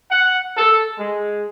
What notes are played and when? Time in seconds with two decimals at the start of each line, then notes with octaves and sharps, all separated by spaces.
0.11 F#5
0.57 A4
0.99 G#3